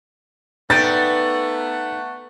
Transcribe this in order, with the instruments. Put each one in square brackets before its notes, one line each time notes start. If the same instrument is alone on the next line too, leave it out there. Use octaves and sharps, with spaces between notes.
[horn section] A3 F#5 [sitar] B3 [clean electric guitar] D#4 D5 G5 [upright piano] A6